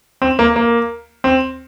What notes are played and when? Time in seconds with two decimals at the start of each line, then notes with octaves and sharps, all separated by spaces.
0.22 C4
0.39 A#3
0.56 A#3
1.24 C4